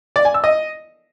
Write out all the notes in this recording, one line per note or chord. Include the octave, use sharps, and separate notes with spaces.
D5
G#5
E6
D#5